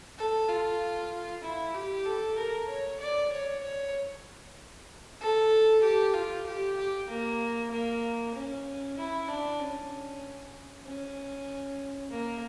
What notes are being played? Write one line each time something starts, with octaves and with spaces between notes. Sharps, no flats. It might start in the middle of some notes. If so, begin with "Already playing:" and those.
A4
F4
E4
G4
A4
A#4
C#5
D5
C#5
C#5
A4
G4
F4
G4
G4
A#3
A#3
C#4
E4
D4
C#4
C#4
A#3